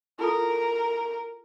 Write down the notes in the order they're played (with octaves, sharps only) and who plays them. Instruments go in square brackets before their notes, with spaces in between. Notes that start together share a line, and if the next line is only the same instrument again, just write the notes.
[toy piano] E4 F4 A4 [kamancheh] A#4